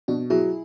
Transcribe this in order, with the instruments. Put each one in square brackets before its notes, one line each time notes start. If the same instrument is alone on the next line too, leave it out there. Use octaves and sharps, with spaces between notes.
[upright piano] B2 [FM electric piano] D4 F#4
[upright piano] F#3 [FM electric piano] E4 G#4